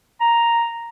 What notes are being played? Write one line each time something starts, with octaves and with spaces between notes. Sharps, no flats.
A#5